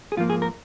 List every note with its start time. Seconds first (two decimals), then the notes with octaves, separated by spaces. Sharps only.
0.12 G#4
0.17 G#2 F3 A#3 F4
0.30 G#4
0.42 A#4